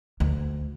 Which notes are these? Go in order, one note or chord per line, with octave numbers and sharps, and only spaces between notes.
D2